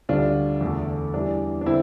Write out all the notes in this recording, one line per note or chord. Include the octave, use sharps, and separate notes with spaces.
D2 D3 G3 D4 F4
E2 D3 A3
E2 E3 G3 D4
D4
D3 C4 E4